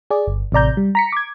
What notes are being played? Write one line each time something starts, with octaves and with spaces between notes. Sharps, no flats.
G#4 D5
G1
A1 C3 D5 A#5 G6
G3
A#5 B6 C#7
D6 G#6